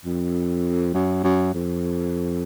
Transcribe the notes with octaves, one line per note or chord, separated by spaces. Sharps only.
F2
F#2
F#2
F2